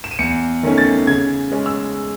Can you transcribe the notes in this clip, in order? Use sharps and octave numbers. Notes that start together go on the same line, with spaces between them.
E7
D#7
E2 C#7
D#3 A3 C#4
A6
C#3 G#6
G#3 C#4
E6